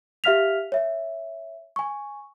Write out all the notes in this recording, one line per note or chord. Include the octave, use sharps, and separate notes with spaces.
G4 E5 F5 F6 B6 F7
C#5 E5
G#5 C#6